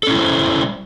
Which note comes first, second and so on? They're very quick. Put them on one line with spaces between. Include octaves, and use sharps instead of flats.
A4 C#4 E4 G3 C5